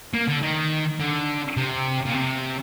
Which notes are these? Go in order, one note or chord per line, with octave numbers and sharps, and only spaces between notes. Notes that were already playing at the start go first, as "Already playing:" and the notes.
A#3
D3
D#3
D3
C3
A#2
C3